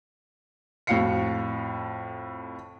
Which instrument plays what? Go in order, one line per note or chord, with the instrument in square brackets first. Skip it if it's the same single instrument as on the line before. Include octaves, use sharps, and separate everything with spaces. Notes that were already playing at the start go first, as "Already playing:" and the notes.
[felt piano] F2 A2 F#4 F5 C7 C#7